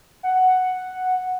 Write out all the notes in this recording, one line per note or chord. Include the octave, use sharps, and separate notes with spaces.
F#5